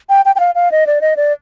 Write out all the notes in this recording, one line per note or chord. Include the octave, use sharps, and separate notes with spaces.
G5
G5
G5
F5
F5
D#5
D5
D#5
D5